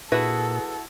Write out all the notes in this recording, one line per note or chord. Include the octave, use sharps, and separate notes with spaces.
A#2 E4 F#4 G#4 A4 B4